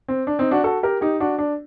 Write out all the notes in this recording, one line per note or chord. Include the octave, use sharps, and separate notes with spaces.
C4
D4
C4 D#4
D4 F#4
F#4 A4
G4 A#4
D#4 G4
D4 F#4
D4